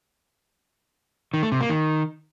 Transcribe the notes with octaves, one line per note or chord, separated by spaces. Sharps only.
D#3
A3
C3
A#3
D#3